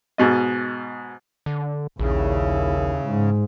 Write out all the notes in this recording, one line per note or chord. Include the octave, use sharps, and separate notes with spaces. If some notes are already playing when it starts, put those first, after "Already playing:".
G#2 B2 D#5
D3
A#1 D#2 C#3 E4
G#2